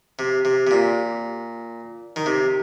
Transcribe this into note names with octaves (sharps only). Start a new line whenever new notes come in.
C3
C3
C3
A#2
D#3
C3